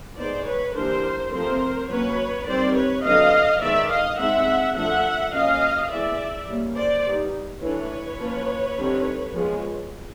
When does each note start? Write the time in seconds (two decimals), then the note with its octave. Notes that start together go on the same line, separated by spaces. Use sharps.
0.17 G#3 B3 D#4 C5 D5
0.46 B4 C#5
0.75 E3 G3 A#3 D4 A#4 C5
1.32 F3 A3 C4 A#4 C5
1.89 F#3 A#3 C#4 B4 C#5
2.47 D#3 G3 C4 C5 D5
2.75 B4 C#5
3.04 D3 F#3 B3 D#5 F5
3.61 D#3 G#3 B3 D5 E5
3.90 D#5 F5
4.18 G#3 C4 D#4 E5 F#5
4.76 F3 A3 D4 E5 F#5
5.33 F#3 A#3 C#4 D#5 F5
5.90 E3 G#3 B3 D5 E5
6.47 G3 A#3 C#4
6.76 C5 D5
7.05 G3 B3 D#4
7.62 E3 A3 D4 B4 C#5
8.20 F3 A#3 C#4
8.77 D3 G3 C4 D#4
9.34 F3 G#3 B3